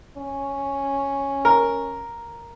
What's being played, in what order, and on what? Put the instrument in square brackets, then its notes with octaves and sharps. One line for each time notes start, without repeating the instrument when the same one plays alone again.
[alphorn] C#4
[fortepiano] A#4